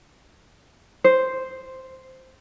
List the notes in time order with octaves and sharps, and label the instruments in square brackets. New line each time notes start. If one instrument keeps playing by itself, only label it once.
[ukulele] C5